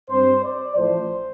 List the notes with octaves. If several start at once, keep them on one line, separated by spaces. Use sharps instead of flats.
G2 G3 C4 C5
D5
A1 A2 F3 A3 C5